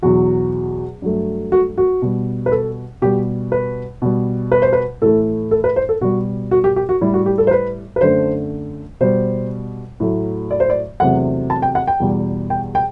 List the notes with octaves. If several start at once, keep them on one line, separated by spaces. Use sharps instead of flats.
E2 B2 F#3 F#4
G2 F#3 A3
F#4
F#4
B2 G3
B4
A4
B2 G3 G4
B4
B2 G3
B4
C5
B4
A2 E3 A3 A4
A4
B4
C5
A4
B2 G3 F#4
F#4
G4
G4
F#4
A2 G3 E4
F#4
G4
A4
C5
B4
B4
F#2 D3 A3 C5
B2 G3 C5
A2 F#3 A3
D5
C5
D5
E2 C3 F#3 A3 F#5
A5
G5
F#5
G5
E2 B2 G3
G5
G5